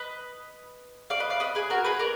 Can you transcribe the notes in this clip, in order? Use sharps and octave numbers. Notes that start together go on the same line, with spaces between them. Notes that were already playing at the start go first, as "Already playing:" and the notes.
Already playing: B4 D#5
D5 F5
B4 D#5
D5 F5
B4 D#5
G#4 B4
F#4 A#4
G#4 B4
A#4 D5